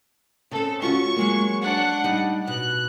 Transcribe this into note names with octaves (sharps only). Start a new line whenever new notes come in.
C#3 C4 A4
C#4 F4 F#4 C#6
F#3 G#3 A#3
D4 F#5
G3 D#4
B2 F#6